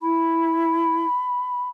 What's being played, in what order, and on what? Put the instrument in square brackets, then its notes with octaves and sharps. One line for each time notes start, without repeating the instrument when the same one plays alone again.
[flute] E4 [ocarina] B5